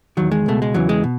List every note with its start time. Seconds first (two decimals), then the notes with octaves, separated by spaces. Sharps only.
0.17 E2 D#3 F#3
0.32 G#3
0.46 C#2 B2 A3
0.62 G#3
0.74 E2 C#3 E3 F#3
0.89 G#3
1.04 B2